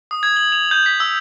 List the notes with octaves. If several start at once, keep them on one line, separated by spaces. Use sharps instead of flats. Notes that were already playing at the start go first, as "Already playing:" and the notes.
D#6
G#6
F#7
F7
G6
B6
E6